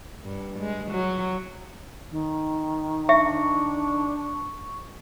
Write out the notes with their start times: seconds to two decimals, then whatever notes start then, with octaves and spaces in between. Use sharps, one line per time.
0.24 G2
0.59 G#3
0.91 F#3
2.11 D#3
3.09 D4 E5 C#6